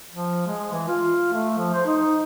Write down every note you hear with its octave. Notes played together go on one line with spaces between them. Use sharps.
F3
G#3
E3
F4
A3
F3
C5
D#4